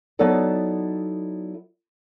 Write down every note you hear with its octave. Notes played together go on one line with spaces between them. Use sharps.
F#3 B3 D#4 E4 A4 D5